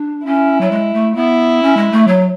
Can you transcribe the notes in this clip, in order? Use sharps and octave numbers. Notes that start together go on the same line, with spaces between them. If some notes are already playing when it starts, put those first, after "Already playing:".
Already playing: D4
C#4 E4
F#3
G#3
A3
B3 E4
C#4
G#3
A3
F#3